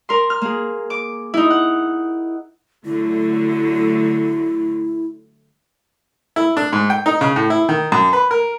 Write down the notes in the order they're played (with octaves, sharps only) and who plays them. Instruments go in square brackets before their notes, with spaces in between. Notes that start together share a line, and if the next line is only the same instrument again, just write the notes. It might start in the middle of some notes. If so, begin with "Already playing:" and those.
[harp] A#4 C6
F6
A#3 G#4
D6
D#4 E4
F#5
[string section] D3 F#3 A3 [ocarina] E4
[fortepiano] E4
D4
G#2
G5
D#4
C#3
A2
E4
D#3
F#2
B4
A#4